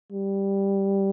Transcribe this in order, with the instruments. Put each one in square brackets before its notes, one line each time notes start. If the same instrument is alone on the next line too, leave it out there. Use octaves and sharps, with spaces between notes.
[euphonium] G3